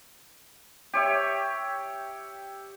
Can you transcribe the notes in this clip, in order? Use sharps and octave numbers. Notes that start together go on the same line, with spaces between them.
G4 C#5 E5